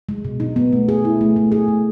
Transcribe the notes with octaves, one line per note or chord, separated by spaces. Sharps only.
G#3
B2
D#4
B3
A3
G#4
E4
A3
A3
G#4
A3